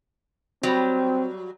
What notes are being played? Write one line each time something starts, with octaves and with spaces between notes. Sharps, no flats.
F#3 G3 C4